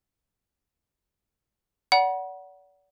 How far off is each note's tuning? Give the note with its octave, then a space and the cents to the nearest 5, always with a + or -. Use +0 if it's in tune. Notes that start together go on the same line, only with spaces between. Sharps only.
D5 -40 F#5 +10 B5 -45